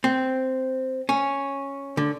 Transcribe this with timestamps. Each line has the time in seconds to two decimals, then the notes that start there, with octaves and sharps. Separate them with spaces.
0.04 C4
1.09 C#4
1.97 D3